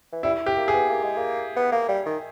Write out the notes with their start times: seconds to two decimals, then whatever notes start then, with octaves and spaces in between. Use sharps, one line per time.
0.13 E3
0.23 G3 E4
0.46 G4
0.57 A#3
0.68 G#4
0.73 B3
0.90 A#3
1.04 G#3
1.17 A#3
1.56 B3
1.72 A#3
1.89 G3
2.06 D#3